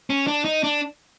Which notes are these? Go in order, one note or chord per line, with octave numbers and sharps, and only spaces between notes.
C#4
D4
D#4
D4